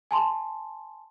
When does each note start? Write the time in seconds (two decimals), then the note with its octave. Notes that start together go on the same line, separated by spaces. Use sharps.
0.11 G#5 A5 C6